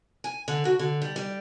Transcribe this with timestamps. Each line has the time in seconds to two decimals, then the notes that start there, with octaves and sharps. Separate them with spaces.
0.24 G#5
0.48 D3
0.65 F#4
0.79 D3
1.02 G3
1.16 G3